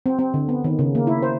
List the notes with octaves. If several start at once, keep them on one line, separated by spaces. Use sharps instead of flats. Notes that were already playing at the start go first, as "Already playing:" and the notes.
C4
C4
D3
B3
D#3
C#3
A#3
E4
C5